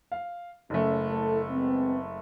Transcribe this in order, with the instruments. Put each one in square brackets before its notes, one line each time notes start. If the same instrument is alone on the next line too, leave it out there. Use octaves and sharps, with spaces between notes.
[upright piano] F5
[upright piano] F#1 A3 [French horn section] C#4
[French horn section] A2 A4
G#3 B3 C4